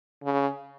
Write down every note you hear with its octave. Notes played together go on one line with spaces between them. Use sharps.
C#3